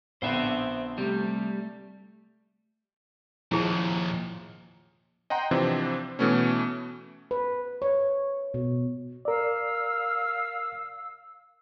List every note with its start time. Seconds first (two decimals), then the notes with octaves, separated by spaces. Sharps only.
0.22 A#1 D3 B3 C4 C5 E5
0.98 C3 G3 A3
3.52 D#2 A#2 F3 E4 G#4 A5
5.30 D#5 F#5 G5 A#5 C6
5.51 C3 E3 F3 C4 D4
6.19 B2 E3 A3 B3 C#4
7.31 B4
7.82 C#5
8.54 B2
9.25 A#4 D5 F5 E6